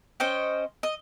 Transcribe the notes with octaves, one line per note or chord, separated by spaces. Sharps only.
C#4 C5 D#5 G5
D#5